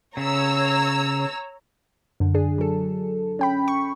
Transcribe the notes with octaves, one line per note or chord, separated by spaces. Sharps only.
C#3 C#5 A#5 E6
F#2 D3
D4 G#4
F#3 A4
C#4 G5 B5
C#6